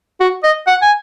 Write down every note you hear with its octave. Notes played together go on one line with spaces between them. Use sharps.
F#4
D#5
F#5
G#5